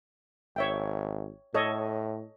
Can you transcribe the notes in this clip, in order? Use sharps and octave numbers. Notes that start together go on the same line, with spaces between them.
G#1 C#5 E5 G5
A2 A4 C#5 D#5